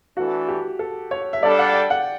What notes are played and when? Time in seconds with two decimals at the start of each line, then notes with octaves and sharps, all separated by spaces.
0.17 E3 A3 D4 F#4 A4
0.48 G4
0.79 A4
1.11 C#5
1.33 E5
1.42 G3 D4 A4 D5
1.59 F#5
1.74 G5
1.90 F#5